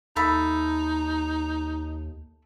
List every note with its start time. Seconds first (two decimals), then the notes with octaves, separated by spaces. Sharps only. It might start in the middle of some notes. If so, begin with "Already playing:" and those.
0.16 D#2 D#4 A4 E5 B5